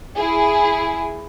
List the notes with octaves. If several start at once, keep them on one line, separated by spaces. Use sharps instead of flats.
E4 G#4